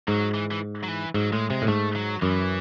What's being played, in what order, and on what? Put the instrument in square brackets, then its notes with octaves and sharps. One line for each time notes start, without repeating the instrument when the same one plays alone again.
[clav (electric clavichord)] G#2 [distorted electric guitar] F#3
[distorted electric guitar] E3
E3
F#3
E3
[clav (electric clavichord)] G#2 [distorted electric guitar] F#3
[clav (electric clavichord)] A2 [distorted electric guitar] G#3
[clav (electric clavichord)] C3 [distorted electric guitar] G#3
[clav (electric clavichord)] A2
[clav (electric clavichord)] G#2 [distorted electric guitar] A3
[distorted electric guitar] F#3
[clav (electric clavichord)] F#2 [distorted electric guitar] E3